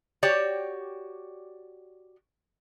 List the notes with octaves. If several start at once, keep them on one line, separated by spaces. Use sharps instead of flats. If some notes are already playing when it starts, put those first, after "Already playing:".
F#4 G4 C#5 D5